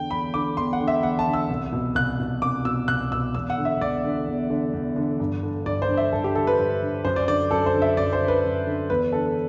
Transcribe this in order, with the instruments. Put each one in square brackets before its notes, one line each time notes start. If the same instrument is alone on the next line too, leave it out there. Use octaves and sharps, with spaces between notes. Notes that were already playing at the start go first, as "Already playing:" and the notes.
Already playing: [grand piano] E2 D3 G5
E2 B5
D3 D6
E2 C6
F#5
D3
E5
E2 F#5
A5
D3
E6
C2
B2
C2 F#6
B2
C2 D6
B2 E6
C2 F#6
B2 E6
E2 E6
F#5
D3
E5
E2 D5
D3
E2
D3
E2
D3
G2
D3
G2 D5
C5
D3
E5
G2 A4
G4
D3 A4
B4
G2
D3
F#2 C5
D5
D3 D5
F#2 A4
C5
D3
E5
F#2 D5
C5
D3
B4
F#2
D3
E2 B4
D3 A4